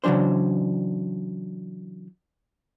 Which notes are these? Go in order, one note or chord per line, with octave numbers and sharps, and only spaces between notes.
C#3 E3 F#3 D4 C5